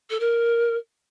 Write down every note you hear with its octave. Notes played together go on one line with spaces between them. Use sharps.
A4
A#4